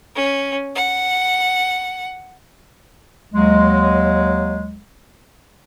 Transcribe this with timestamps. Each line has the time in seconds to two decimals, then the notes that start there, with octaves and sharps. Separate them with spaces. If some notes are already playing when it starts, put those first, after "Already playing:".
0.15 C#4
0.76 F#5
3.33 D#2 F#3 G#3